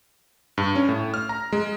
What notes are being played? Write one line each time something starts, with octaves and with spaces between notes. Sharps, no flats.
G2
C#4
A2
F6
A#5
G#3